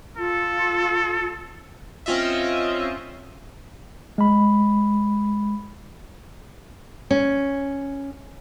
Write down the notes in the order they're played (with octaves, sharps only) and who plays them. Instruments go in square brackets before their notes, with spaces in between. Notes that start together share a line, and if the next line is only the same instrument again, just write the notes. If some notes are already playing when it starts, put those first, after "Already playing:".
[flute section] F4 [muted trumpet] A4
[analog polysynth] C4 C#4 F4 D#5 E5
[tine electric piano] G#3 B5
[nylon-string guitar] C#4